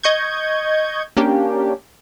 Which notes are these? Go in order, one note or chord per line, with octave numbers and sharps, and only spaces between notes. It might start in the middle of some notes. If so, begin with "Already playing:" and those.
D#5 C#6 G6 G#6
A#3 C#4 D4 G4